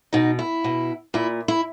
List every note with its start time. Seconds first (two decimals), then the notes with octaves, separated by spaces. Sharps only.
0.13 B2 D#4
0.39 E4
0.64 B2
1.14 A#2 E4
1.48 E4